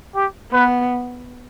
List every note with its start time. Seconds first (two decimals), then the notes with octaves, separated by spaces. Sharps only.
0.15 G4
0.52 B3 B4